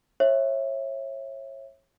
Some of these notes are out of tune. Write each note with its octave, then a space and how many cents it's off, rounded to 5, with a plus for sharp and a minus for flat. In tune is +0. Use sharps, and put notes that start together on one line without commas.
C#5 -30 E5 +0